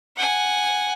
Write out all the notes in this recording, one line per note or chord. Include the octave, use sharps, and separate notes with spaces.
F#5 G#5